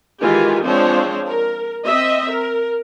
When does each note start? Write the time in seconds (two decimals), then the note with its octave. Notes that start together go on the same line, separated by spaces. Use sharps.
0.21 D#3 E3 G#3 F4 G4 G#5
0.64 F3 G#3 C4 D4 C5 C#5
1.28 A#4
1.85 C4 D#5 E5
2.30 A#4